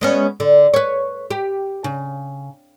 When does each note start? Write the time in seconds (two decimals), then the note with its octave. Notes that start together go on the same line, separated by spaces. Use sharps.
0.01 G#3 B3 C#4
0.40 D3
0.74 B4 C#5
1.31 G4
1.84 C#3